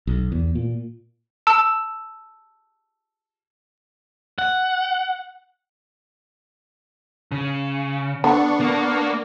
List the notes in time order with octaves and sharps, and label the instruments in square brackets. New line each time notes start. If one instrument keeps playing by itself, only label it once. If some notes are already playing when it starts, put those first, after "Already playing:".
[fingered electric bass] B1
E2
A#2
[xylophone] A5 E6
[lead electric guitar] F#5
C#3
[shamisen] D3 [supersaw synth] B3 D4 C#6
[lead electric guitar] A#3